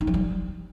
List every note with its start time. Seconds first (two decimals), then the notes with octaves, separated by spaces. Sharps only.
0.01 D#4
0.07 F3
0.14 G3